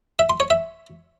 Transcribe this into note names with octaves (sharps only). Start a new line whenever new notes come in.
E5
C6
C#5
E5